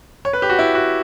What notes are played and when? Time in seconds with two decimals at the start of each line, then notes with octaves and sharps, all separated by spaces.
0.25 C#5
0.33 B4
0.42 G4
0.49 F#4
0.59 E4
0.75 F#4